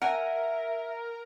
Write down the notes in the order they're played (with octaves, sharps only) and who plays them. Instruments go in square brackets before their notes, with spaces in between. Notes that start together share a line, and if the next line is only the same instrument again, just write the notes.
[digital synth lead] A#4 [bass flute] E5 [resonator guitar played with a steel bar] F#5 G#5